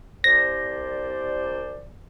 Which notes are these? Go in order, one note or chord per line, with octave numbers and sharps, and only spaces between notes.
C2 C5 D5 A#6